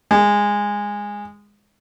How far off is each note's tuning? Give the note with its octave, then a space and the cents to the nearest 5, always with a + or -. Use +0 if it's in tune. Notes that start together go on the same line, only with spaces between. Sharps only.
G#3 -15